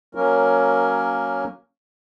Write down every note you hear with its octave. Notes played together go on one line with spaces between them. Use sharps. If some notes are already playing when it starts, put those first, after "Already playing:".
F#3 A#3 C#4 A#4